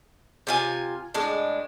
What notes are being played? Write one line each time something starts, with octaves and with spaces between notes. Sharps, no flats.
C3 F4 G#5
A2 G#3 D4